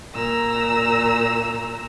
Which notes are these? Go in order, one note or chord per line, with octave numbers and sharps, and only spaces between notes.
A#2 A#5 E6